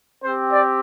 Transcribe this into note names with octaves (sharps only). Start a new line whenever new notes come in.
C4 G4 C5
D5